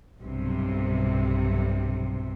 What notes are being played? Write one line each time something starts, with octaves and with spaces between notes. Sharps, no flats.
B1 G2 C3